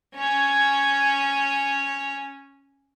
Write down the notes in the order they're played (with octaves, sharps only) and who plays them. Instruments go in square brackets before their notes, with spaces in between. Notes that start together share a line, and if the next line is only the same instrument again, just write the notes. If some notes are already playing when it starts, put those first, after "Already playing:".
[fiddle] C#4 C#5